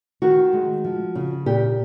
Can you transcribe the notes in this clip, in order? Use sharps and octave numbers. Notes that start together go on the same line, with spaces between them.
D#3 F#4
G#3
F3
C#3
A#2 G4